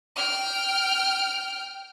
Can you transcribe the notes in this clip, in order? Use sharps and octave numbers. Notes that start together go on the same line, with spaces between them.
G5 F6